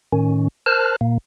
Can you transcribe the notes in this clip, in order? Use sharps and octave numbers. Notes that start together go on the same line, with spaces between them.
A2 D#3 C#4
A#4 C5 A5 F6 F#6
A#2 A#3